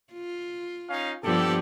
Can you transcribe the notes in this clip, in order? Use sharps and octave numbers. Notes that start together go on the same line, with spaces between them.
F4
C#4 D#4 F5
G2 F3 B3 G4 A4